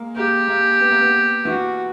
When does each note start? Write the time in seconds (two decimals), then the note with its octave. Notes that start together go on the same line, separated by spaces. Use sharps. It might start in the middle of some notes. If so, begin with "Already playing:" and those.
Already playing: G#3 A#3
0.16 A#3 G4
0.48 A#3
0.80 B3
0.91 A#3
1.01 B3
1.45 E3 F#4